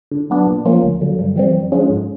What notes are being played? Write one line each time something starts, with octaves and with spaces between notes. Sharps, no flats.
D3
F#3 B3 D4
A#2
F3 A#3 C#4 F4
D2
D3 F#3
G2
E3 G3 C4
F#2
D3 F3 G#3 C#4
G#2